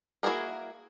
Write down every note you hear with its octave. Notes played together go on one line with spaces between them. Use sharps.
A#3 E4 F#4 G#4 A#4